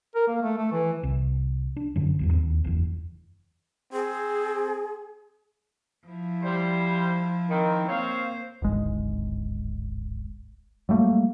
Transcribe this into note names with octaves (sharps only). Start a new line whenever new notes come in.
A#4
A#3
A3
A3
E3
C2
D4
F#1 F#2 D3 F#3
G#1 E2 G2
D#2 C4
F#1 E2
C4 G#4
F3 E4
G3 C5
D#3 C4
A#3 C4 C5 C#5 F5
D1 G#1 G#3
F#3 G3 A3 A#3